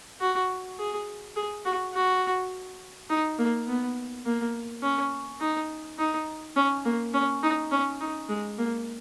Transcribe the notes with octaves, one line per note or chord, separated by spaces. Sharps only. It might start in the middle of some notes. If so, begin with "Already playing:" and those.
F#4
G#4
G#4
F#4
F#4
D#4
A#3
B3
A#3
C#4
D#4
D#4
C#4
A#3
C#4
D#4
C#4
D#4
G#3
A#3